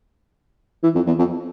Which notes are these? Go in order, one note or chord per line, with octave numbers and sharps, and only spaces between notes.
E3
F2
E2
F2